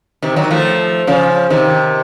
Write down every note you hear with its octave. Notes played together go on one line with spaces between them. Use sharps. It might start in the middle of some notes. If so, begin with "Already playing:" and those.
C3 D#3
D#3 F#3
F3 A3
C#3 F3
C3 D#3